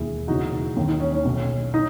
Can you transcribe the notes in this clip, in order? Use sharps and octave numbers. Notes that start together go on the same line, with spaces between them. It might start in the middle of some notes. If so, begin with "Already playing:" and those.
Already playing: E1 D#2 D#3 E4 G#4
E1 E2 C#3 E3 D#4 F#4
D#2 D#3
D#4
C#4
C#4
B1 B2
D#4